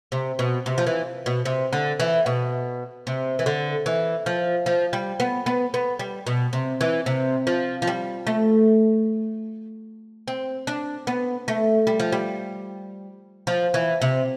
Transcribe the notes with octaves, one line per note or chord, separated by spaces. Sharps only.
C3
B2
C3
F3
E3
B2
C3
D3
E3
B2
C3
E3
D3
E3
F3
F3
G3
B3
B3
B3
G3
B2
C3
E3
C3
F3
F3
G3
A3
C4
D4
B3
A3
G3
F3
G3
F3
E3
C3